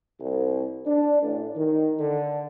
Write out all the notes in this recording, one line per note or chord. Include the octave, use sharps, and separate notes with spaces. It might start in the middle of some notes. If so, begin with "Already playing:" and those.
C2
D4
A1
D#3
D3